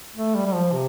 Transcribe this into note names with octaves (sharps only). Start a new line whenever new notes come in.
A3
G3
G3
F3
C3